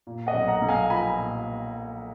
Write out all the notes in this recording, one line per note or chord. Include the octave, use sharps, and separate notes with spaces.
A#2
D#5 F#5
B1
F#5 A#5
B1
F5 G#5
F3 G#5 B5
A#2